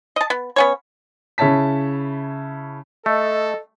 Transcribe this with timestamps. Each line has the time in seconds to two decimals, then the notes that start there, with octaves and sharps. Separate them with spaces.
0.16 D#5 A5
0.30 B3
0.56 B3 C#4 C#5
1.38 C#3 E4 C#5 A5 B6
3.06 A3 A4 D#5